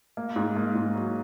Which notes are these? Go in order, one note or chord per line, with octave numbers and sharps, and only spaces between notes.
A#3
G#2
A#3
G#2
F#3